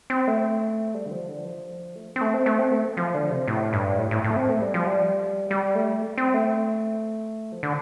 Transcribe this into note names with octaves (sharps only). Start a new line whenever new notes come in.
C4
A3
G3
D3
F3
D3
F3
A3
C4
A3
C4
A3
C4
A3
F3
D3
C3
A2
G2
A2
A2
A2
A3
C4
A3
G3
F3
G3
G3
A3
C4
A3
F3
D3